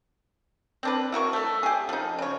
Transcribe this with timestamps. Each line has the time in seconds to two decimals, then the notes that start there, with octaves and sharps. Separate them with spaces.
0.83 C4 D4 B4
1.12 E4 F#4 A#4 C#6
1.33 A3 A4
1.63 G4 G#4
1.89 F3 D#4
2.19 C#3 C#5